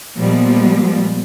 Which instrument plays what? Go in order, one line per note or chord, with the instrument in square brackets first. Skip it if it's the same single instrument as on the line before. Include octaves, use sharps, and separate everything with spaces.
[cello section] A#2 F3 G3 G#3 B3